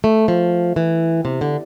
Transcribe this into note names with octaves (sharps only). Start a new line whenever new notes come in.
A3
F3
E3
C3
D3